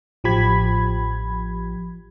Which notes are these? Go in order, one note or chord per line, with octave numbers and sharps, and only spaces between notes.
A1 F3 G4 B5 G#6